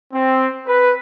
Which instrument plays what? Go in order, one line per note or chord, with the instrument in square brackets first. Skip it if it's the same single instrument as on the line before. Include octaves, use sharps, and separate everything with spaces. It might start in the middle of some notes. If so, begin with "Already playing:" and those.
[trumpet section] C4
B4